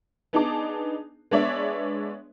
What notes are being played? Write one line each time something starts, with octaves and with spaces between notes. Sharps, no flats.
B3 D4 D#4 G#4 A5 D6
G#3 B3 D4 C#5 D5 E5